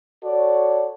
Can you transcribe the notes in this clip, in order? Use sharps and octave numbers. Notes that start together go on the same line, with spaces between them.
F#4 A4 C#5 D5